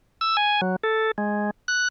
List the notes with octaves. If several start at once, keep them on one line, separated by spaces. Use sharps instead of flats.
E6
G#5
F#3
A4
G#3
F#6